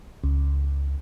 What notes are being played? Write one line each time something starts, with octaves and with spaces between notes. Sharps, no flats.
C#2